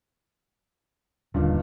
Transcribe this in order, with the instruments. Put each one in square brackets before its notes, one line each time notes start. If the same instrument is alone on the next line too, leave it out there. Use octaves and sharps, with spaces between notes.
[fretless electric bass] D#1 D2 [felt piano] G2 A#2 D#3